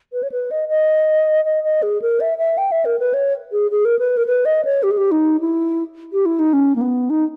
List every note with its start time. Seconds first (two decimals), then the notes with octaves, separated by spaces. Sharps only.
0.13 B4
0.23 C#5
0.32 B4
0.51 D#5
0.69 D#5
1.45 D#5
1.64 D#5
1.82 G#4
2.02 A#4
2.20 E5
2.38 E5
2.58 G5
2.72 E5
2.85 A#4
2.99 B4
3.14 C#5
3.52 G#4
3.71 G#4
3.85 A#4
3.99 B4
4.17 A#4
4.26 B4
4.45 D#5
4.65 C#5
4.83 G4
4.91 G#4
4.97 G4
5.11 D#4
5.40 E4
6.13 G4
6.26 E4
6.39 D#4
6.53 C#4
6.76 A#3
6.81 B3
7.10 D#4